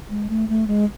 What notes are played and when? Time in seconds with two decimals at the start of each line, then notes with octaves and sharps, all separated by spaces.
0.10 G#3
0.29 A3
0.49 A3
0.68 G#3